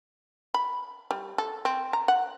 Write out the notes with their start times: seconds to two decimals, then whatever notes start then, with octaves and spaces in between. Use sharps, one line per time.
0.54 B5
1.11 G3
1.38 A4
1.65 C4
1.93 A#5
2.08 F#5